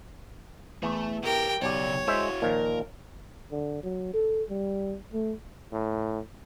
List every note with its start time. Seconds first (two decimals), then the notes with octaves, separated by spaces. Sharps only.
0.83 E2 E3 A3
1.23 D2 G4 A#4 G5
1.62 B1 C#3 G4 C#5 D5
2.08 G#3 E4 F#4 C5 E5
2.42 A#2 D#3 F3 A#4
3.51 D3
3.84 F#3
4.14 A4
4.49 G3
5.13 A3
5.72 A2